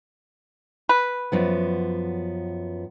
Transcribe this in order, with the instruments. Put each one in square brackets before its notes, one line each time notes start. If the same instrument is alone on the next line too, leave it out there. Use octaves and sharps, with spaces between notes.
[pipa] B4
[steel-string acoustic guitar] F#2 F3 B3